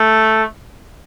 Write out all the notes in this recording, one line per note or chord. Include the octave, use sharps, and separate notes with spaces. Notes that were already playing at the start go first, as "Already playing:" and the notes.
Already playing: A3